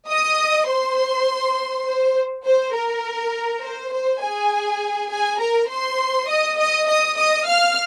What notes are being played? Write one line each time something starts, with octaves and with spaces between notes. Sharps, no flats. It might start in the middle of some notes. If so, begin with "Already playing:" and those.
D#5 D#6
C5 C6
C5
C5
A#4
C5
C5
G#4 G#5
G#4 G#5
A#4 A#5
C5 C6
D#5 D#6
D#5 D#6
D#5 D#6
D#5 D#6
F5 F6